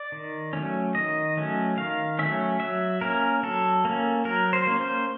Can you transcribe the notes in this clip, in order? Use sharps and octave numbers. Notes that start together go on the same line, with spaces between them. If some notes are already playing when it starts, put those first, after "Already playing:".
Already playing: D5
D#3
F#3 A3 C#4
D#3 D#5
F#3 A3 C#4
D#3 F5
F#3 A3 C#4 E5
F#3 E5
A#3 C#4 A#4
F#3 A4
A#3 C#4
F#3 A#4
C5
A#3 C#4
C5